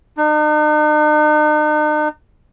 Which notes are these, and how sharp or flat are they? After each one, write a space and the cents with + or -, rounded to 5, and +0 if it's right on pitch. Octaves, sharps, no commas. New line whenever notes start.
D#4 -45